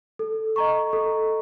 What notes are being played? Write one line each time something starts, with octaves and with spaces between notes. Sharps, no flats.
A4
D#5 A#5 C#6
A4